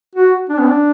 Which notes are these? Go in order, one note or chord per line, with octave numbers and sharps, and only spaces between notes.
F#4
D4
B3
D4